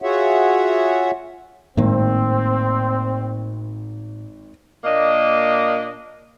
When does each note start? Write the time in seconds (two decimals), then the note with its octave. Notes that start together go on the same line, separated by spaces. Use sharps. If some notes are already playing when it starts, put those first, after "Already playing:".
0.02 F4 F#4 G#4 C#5 E5 F#5
1.77 G#1 A2 A#3 C4
4.84 A#2 A#3 D4 D#5